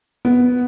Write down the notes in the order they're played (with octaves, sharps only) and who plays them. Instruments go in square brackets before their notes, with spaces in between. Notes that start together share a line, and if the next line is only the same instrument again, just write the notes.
[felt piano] B3